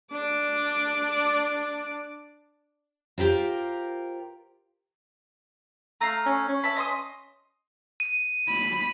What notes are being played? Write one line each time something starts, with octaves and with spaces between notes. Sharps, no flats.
D4 D5
F4 G4 A#4 C5
A3 F5 A#5
C#4
C#4
E5 A5 B5
D#5 C6 D#6
D#7
B5